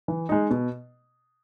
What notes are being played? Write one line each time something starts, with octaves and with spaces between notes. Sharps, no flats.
E3
G#3 D#4
B2